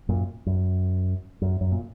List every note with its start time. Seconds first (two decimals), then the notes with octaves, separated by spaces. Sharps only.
0.09 F#2 A#2
0.46 F#2
1.42 F#2
1.61 F#2
1.72 A#2